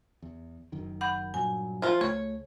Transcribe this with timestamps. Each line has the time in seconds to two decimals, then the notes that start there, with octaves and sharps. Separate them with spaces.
0.22 E2
0.72 F#1 F#2 D#3
1.01 F#5 B5 G6
1.34 G2 A#2 F#3 G#5
1.82 F3 F4
2.01 C#2 A3 C#5